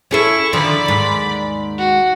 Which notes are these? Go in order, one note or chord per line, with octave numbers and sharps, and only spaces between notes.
C#4 E4 G#4 A4 C#6
D3 D#3 F3 D5 B5
D#2 G#2
F#4